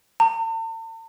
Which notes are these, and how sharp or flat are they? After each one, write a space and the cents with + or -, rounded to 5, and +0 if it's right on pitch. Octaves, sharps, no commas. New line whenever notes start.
A5 +45